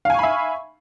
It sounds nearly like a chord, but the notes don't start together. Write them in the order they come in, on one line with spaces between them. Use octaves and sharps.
F5 G#5 C#6 B5 E5